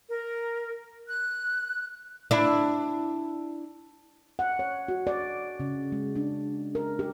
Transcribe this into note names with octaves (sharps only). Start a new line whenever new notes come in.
A#4
F#6
D4 E4
F#5
C#5
F#4
D5
C#3
G#3
D4
A#4
G4